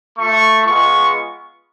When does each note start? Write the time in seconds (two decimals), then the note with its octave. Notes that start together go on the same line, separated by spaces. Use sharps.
0.18 A3 F4 C#6
0.66 G#3 B3 F4 C#6